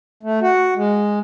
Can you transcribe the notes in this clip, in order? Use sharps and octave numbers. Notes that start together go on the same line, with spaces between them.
A3
F#4
G#3